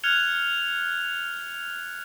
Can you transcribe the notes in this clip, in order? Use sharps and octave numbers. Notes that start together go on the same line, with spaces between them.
F6 F#6 G#6 C#7 F7 G7